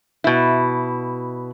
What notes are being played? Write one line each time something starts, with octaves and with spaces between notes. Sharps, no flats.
B2 E4